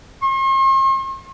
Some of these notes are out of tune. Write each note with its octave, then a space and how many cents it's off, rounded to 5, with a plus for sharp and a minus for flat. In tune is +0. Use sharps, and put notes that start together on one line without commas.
C6 +45